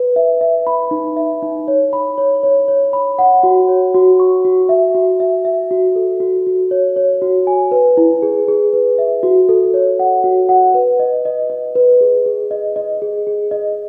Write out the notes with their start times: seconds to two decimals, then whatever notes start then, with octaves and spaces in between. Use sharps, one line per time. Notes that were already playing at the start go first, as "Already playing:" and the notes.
Already playing: B4
0.16 E5
0.41 E5
0.67 B5
0.91 D#4
1.17 E5
1.42 D#4
1.68 C#5
1.93 B5
2.18 C#5
2.43 C#5
2.68 C#5
2.93 B5
3.19 F#5
3.43 F#4
3.69 C#5
3.94 F#4
4.20 C#6
4.45 F#4
4.69 E5
4.95 F#4
5.20 E5
5.45 E5
5.71 F#4
5.96 A4
6.20 F#4
6.47 F#4
6.71 C#5
6.96 C#5
7.22 F#4
7.47 G#5
7.71 B4
7.97 E4
8.22 G#4
8.48 G#4
8.73 B4
8.98 E5
9.23 F#4
9.49 A4
9.74 C#5
9.99 F#5
10.24 F#4
10.49 F#5
10.74 B4
10.99 D#5
11.25 D#5
11.50 D#5
11.75 B4
12.01 G#4
12.26 G#4
12.51 D#5
12.76 D#5
13.02 G#4
13.27 G#4
13.51 D#5